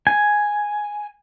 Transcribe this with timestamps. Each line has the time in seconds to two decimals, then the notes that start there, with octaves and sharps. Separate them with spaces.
0.07 G#5